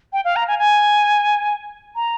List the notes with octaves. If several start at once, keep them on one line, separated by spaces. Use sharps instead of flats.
G5
F5
A#5
G#5
G#5
A#5